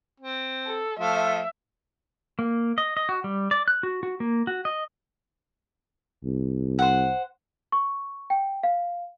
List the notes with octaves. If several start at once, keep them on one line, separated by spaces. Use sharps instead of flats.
C4
A4
F3 A3 F4 E5
A#3
D#5
D#5
F#4
G3
D5
F#6
F#4
F#4
A#3
F#4
D#5
C2
C5 F#5
C#6
G5
F5